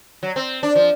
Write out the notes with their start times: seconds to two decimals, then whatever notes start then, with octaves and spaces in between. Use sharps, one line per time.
0.23 F#3
0.36 C4
0.63 D4
0.76 F3